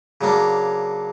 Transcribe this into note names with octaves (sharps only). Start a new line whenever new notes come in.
C#3 F#3 A#3 D4